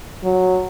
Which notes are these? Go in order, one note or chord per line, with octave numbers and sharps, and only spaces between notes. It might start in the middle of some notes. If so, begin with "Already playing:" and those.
F#3